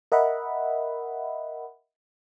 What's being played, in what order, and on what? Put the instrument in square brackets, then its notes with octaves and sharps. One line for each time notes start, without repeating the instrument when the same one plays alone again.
[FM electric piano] A#4 D#5 E5 F#5 B5